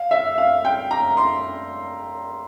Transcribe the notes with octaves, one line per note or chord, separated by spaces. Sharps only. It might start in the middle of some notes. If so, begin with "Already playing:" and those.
Already playing: F5
E5
F5
G5
A#5
C6